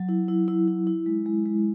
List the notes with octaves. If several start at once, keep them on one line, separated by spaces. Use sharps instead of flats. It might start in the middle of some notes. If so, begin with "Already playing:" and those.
Already playing: F#3
E4
E4
E4
E4
E4
G#3
G#3
G#3